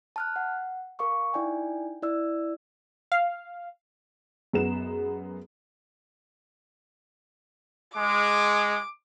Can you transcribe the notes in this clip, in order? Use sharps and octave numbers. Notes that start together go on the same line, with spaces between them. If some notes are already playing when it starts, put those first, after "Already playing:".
A5 F6 F#6
F#5
A#4 F5 C#6 D6
D#4 E4 D5 G5 G#5
E4 D5 E6
F5
F#2 G#3 B3 E7
G#3 D6